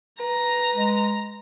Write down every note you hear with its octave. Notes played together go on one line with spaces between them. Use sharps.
B4 A#5
G#3